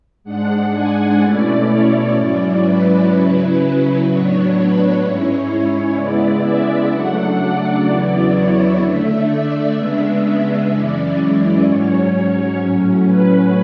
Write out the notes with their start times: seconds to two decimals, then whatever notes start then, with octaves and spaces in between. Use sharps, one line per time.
0.24 G#2 G#3 D4 F#5
0.72 G#5
1.19 B2 A3 C#4 E4 D5
1.66 C#5
2.14 G#2 F#3 C#4 E4 D5
2.61 B4
3.09 C#3 F#3 C#4 E4
3.56 B4
4.04 A2 F#3 B3 D4 C#5
4.52 B4
4.98 G#2 G#3 C#4 E4 C#5
5.94 C#3 G#3 B3 E4 D5
6.41 E5
6.89 C#3 F#3 A3 D4 F#5
7.36 D5
7.84 E2 C#3 F#3 B3 E4 D5
8.31 C#5
8.78 D3 A3 D4 E5
9.26 D5
9.73 C#3 G#3 B3 D4 E5
10.68 F#2 E3 G#3 C#4 E4 D5
11.16 D5
11.63 G#2 F#3 C#4 C#5
12.11 C#5
12.58 A2 F#3 C#4
13.06 B4